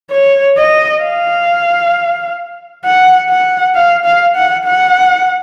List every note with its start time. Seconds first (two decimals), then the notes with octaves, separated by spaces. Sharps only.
0.12 C#5
0.57 D#5
1.03 F5
2.85 F#5
3.30 F#5
3.75 F5
4.05 F5
4.36 F#5
4.65 F#5